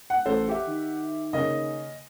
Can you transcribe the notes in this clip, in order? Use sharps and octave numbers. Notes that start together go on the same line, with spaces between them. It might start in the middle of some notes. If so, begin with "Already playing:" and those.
F#5
A1 A4 C5
G4 E5
D#3
C#3 A#3 D#5